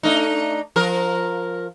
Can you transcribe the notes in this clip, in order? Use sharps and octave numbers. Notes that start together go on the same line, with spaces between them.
A3 D4 D#4
F3 A#4